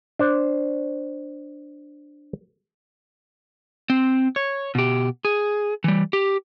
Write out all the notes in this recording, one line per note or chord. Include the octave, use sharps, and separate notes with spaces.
D4 C5
C4
C#5
B2 G4
G#4
E3 G3
G4